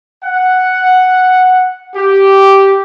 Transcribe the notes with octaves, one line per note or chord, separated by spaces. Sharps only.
F#5
G4